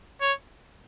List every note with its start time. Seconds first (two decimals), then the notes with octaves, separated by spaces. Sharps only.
0.21 C#5